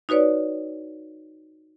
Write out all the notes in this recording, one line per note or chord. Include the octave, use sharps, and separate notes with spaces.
D#4 F#4 B4 C#5 D5